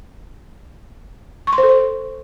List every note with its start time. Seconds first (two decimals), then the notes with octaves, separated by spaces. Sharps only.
1.47 C#6
1.53 C6
1.58 C5
1.63 A4
1.69 C5